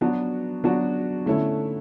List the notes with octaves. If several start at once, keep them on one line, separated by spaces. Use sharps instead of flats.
F#3 B3 D4 F#4
F#3 B3 D4 F#4
D3 A3 C#4 E4